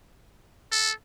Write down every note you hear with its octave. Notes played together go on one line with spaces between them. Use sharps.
A4